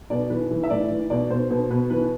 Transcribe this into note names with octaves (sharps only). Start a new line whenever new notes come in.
B2 D5
E3 B4
E3
E5
A2 D5
E3
B2 D5
B2 C5
B2 C5
B2 B4
E3 B4